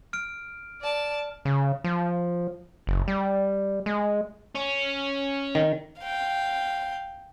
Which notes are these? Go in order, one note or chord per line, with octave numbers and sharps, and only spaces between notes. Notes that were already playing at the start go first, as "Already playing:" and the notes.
F6 D7
D5 A5
C#3
F3
F#1
G3
G#3
C#4
D#3
F5 G5